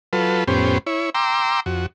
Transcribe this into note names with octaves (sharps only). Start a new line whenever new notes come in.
F#3 F4 A4 B4
F2 A2 B3 C#4 G4 C5
E4 C#5
G5 A#5 C6 D6 E6
F2 F#4